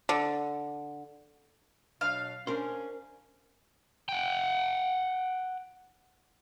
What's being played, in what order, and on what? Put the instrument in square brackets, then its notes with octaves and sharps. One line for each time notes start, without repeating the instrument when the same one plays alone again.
[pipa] D3
[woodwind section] B2 F#3 D4 [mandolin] F5
[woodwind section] C#4 [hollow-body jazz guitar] D4 A#4 C5
[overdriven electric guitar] F#5 G5